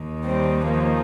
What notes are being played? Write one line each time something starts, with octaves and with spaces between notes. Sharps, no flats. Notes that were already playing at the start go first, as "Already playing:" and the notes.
Already playing: D#2 D#3
G3 C4
F3 A#3